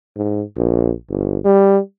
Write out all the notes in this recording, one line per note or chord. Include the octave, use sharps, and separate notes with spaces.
G#2
A#1
G1
G3